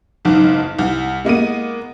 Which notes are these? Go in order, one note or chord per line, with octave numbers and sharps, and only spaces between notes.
F#1 B1 G#2
C2
G#3 A#3 B3 D#7